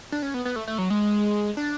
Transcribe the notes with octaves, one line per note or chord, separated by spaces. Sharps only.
D4
C#4
B3
B3
A3
A3
F#3
G#3
D4